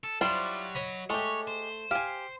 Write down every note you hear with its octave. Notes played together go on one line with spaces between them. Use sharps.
A4
F#3 G3 D4 E4 F4 C5
C#5 D#5 B5
G#3 A3 G4 C#5
C5
G4 F5 G#5